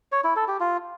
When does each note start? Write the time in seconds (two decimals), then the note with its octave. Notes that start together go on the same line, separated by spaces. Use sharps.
0.12 C#5
0.24 E4
0.36 A4
0.48 G4
0.60 F4